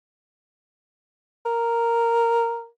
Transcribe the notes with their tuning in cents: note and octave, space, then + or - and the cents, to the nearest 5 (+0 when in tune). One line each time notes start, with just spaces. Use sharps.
A#4 -5